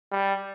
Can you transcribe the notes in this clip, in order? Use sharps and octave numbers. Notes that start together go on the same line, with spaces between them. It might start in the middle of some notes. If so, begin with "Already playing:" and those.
G3